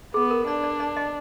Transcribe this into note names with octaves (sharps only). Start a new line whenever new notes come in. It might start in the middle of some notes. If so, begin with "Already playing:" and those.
B3 G#4
A#4
D4 D5
D5
D5
D#5